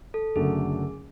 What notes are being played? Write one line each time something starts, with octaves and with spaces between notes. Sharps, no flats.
A4
F#1 F#2 D3 F#3 A3 G#4